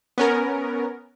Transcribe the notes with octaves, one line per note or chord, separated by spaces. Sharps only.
B3 C#4 A#4